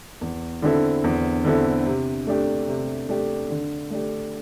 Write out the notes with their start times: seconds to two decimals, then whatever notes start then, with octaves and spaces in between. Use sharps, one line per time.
0.21 E2
0.62 D3 C4 E4 A4
1.04 E2
1.45 D3 C4 E4 A4
1.86 C3
2.27 A3 D4 G4
2.68 C3
3.09 A3 D4 G4
3.50 D3
3.90 A3 D4 G4